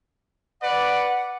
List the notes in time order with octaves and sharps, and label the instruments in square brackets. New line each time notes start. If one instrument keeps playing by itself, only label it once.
[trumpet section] B4 D5 [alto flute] F#5